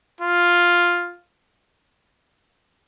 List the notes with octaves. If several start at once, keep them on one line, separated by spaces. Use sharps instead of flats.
F4